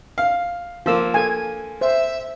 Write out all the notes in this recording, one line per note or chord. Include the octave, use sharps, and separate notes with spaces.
F5
F3 A#3 F4 E6
A4 G#5
C5 E5